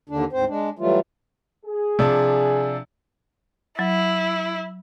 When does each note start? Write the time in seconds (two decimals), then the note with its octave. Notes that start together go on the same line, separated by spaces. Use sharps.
0.09 D#2 D3 D4
0.33 D2 G#2 C4 C5
0.48 G#3 D4
0.79 E3 F#3 G3 A3 F4
1.66 G#4
1.99 C3 F3 D4
3.79 F#3 E4